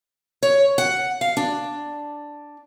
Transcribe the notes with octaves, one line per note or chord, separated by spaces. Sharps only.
C#5
F#5
F5
D4